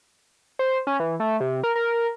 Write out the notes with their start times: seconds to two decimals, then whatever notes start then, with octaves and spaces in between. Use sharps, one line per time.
0.59 C5
0.87 C#4
1.00 E3
1.20 A3
1.40 C3
1.63 A#4
1.75 A#4